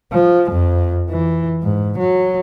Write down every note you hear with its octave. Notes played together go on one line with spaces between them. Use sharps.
F3
F2
E3
G#2
F#3